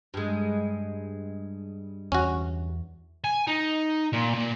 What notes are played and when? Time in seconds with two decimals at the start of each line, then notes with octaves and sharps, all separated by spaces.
0.14 G2 G#3
2.12 E2 C#4 F#4
3.24 G#5
3.48 D#4
4.13 A#2
4.34 A#2